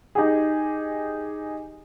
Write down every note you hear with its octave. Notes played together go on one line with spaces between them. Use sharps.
D#4 G4 G#4